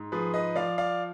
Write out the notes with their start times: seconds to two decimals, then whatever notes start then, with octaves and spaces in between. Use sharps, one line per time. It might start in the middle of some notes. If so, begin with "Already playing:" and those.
Already playing: G#2
0.12 F3 G#4 B4
0.34 B4 D#5
0.56 F3 D5 F5
0.78 D5 F5